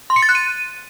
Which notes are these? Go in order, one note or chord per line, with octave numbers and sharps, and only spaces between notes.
C6
C#7
A6
F#6
D#7